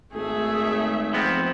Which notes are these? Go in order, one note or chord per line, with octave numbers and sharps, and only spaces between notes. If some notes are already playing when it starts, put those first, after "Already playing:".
G#1 A3 G#4 E5
F3 B3 C4